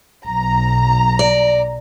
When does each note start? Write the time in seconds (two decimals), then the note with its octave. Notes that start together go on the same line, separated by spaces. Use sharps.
0.25 B1 A#5
1.19 D5